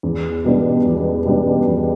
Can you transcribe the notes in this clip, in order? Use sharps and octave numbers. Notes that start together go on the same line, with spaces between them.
E2
B2 G3 B3 D4
E2
B2 G3 B3 D4
E2